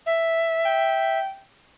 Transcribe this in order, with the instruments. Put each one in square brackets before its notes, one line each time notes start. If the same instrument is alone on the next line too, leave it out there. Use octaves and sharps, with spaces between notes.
[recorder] E5
[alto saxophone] G5